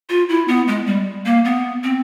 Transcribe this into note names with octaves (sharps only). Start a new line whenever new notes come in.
F4
E4
B3
G#3
G3
A#3
B3
C4